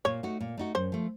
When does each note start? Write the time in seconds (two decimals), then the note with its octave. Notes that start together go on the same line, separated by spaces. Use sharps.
0.05 A#2 C#5
0.23 A3 D#4 F#4
0.40 A#2
0.57 A3 D#4 F#4
0.75 F#2 C5
0.92 F3 A3